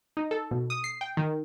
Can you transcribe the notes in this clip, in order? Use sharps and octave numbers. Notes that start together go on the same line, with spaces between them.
D#4
A4
B2
D#6
C7
G5
D#3